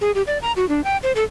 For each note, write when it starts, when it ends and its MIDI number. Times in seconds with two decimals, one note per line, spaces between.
0.01 0.11 68
0.15 0.22 67
0.27 0.38 74
0.42 0.52 82
0.56 0.68 66
0.69 0.84 62
0.84 0.97 79
1.03 1.12 72
1.16 1.23 69